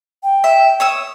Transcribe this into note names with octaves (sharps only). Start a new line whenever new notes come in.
G5
E5
C#5 D#6 E6